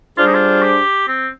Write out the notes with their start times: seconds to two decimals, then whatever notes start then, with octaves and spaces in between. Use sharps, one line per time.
0.17 G3 D4 F4 G#4 C5
0.26 D#4
0.34 F4
0.62 G4
1.08 C4